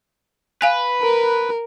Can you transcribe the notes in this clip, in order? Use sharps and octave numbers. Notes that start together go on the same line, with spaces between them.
B4 F5 G#5
A#4